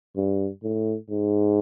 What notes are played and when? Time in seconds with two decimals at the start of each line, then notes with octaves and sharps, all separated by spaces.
0.16 G2
0.63 A2
1.10 G#2